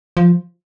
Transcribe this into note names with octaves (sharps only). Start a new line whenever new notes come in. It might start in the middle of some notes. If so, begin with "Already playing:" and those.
F3